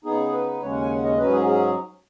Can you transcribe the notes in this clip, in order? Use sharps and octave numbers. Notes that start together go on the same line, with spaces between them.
C#3 B3 D#4 G#4
B4
D#2 C#3 G#3 C#4 C#5
F#5
G#5
F#5
D#5
G#2 F#3 C#4 B4
G#4
G#4